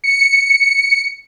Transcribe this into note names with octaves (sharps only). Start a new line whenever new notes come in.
C#7